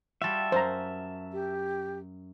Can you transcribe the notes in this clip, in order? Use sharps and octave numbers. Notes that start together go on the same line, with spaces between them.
G3 F4 F#4 E5 A5
F#2 C5 A#5
G4